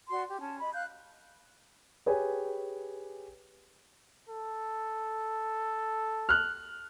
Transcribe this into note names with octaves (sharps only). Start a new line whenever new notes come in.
F#4 D5 C6
G4
C#4 A5
D#5 B5
F5 F#6 G6
G4 G#4 B4 C#5 G5 G#5
A4
F6 F#6